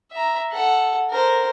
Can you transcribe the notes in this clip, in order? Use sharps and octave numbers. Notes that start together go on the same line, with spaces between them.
E5 A#5
A4 F#5
A#4 C5